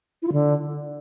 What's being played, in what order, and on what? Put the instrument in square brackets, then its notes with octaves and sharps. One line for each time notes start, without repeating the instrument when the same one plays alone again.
[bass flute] E4
F4
D3